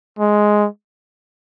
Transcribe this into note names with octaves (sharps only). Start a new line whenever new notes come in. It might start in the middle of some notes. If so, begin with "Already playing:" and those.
G#3